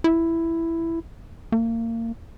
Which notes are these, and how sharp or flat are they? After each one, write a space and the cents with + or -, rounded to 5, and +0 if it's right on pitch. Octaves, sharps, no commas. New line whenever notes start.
E4 +5
A#3 -30